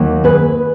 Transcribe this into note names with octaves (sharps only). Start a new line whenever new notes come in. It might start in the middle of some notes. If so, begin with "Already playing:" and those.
Already playing: D#2 D#3 F#3 A#3
G#4 B4